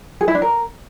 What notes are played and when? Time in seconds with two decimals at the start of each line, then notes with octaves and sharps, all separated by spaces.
0.21 G#4
0.28 E4
0.35 D4
0.42 A#4